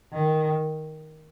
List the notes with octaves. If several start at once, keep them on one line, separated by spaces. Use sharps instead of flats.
D#3